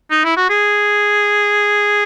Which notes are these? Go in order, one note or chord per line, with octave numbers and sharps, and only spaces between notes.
D#4
E4
F#4
G#4